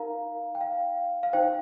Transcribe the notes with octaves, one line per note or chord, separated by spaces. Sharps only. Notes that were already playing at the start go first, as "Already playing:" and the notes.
Already playing: D#4 A#4 F5 A#5
G5
F5
F5
D#4 C5 G5